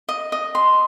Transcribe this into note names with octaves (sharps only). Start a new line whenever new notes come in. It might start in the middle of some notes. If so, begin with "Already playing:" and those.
D#5
D#5
C6